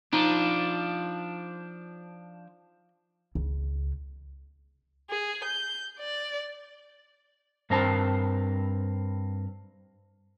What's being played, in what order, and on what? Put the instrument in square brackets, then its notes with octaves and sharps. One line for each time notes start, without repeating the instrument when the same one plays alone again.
[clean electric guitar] F3 D4 [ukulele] D#4
[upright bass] C#2
[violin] G#4
G6
D5
[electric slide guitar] G2 C4 A#4 C5 A5